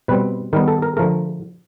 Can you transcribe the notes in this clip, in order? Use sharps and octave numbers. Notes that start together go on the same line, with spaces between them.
B2 G3 C4 B4
D#3 G3 B3 A#4
A4
A#4
D3 F3 A3 A#4